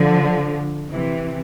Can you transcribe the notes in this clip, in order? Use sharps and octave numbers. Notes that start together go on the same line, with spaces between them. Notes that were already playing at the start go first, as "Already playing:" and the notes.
Already playing: D3 F3
C3 E3